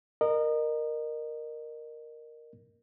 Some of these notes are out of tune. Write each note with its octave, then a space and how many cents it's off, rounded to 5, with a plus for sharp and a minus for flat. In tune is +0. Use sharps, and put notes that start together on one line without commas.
A#4 +0 D#5 -30